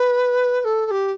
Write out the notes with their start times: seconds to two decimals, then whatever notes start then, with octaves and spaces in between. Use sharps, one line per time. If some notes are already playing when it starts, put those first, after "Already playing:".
Already playing: B4
0.61 B4
0.64 A4
0.86 A4
0.91 G4